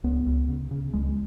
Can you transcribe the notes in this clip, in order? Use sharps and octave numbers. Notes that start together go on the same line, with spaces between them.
C#2 B3
C#2
C#3
C#3
C#2 G#3